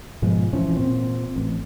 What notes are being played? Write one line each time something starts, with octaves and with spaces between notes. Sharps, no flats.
G#2 B2 F3 G#3
F1 E3 F3 C#4
A#2 C4
A1